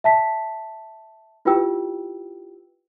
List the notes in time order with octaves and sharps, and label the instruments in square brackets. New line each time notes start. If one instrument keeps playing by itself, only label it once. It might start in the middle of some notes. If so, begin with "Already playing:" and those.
[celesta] E5 A5 B6
E4 F4 G4 B4 G5 E6